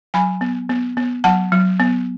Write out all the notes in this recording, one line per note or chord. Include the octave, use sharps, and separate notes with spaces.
F#3 G#5 B5
B3
B3
B3
F#3 F#5 A5
F#3
B3